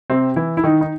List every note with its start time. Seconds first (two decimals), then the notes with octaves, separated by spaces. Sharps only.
0.10 C3 C4
0.36 E3 E4
0.57 E4
0.64 D#3 D#4
0.81 D#4